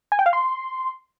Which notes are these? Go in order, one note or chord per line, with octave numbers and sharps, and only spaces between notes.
G#5
G5
F5
C6